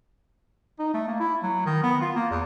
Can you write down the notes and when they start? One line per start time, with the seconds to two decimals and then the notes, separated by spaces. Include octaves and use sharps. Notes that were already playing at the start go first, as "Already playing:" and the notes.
0.79 D#4
0.94 A3
1.08 A#3
1.20 E4
1.43 F#3
1.66 D#3
1.83 B3
2.01 F4
2.15 A#3
2.31 E2